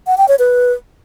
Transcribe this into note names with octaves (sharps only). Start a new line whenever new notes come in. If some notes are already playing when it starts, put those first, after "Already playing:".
F#5
G5
C#5
B4